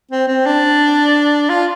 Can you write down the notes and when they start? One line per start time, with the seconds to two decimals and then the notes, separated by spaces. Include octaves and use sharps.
0.11 C4
0.28 C4
0.46 D4
1.49 F4